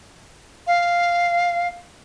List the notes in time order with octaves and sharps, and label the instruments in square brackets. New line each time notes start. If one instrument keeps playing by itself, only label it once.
[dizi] F5